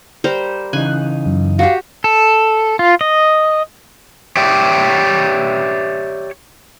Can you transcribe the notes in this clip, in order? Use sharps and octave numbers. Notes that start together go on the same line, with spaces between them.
G3 A#4 C5
C#3 E3 D#4 G#5 F#6
F#2
F#4 G4 F5
A4
F4
D#5
G4 C#5 D5 E5 G5